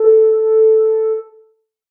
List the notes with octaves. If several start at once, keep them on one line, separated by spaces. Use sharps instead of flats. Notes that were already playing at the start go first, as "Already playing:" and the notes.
Already playing: A4